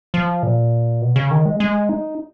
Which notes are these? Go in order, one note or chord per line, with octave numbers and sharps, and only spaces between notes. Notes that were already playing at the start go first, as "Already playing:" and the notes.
F3
A#2
B2
C#3
D#3
G#3
G#3
D#4